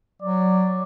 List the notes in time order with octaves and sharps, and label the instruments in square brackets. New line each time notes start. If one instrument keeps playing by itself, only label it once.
[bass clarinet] F#3 [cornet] D5